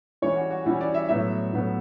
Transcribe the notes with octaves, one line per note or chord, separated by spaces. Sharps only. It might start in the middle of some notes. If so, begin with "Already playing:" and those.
E3 G3 C#4 C#5
F#4
F#4
E3 G3 C#4 E4
D5
E5
A2 F#3 B3 E5
A2 F#3 B3